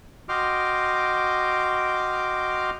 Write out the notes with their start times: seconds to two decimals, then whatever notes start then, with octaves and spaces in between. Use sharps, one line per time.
0.29 F#4 D#5 G5 C6 D6 F6